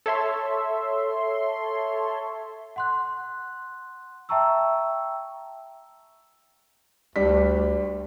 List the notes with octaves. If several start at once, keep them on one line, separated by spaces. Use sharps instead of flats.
A4 C#5 E5 C6
F#5 C6 F#6
E5 G5 A5 A#5 C#6 E6
D2 G3 D4 B6